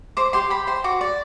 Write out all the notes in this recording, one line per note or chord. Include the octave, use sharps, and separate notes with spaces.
C5 D6
G4 C6
G4 B5
C5 C6
F#4 D6
D5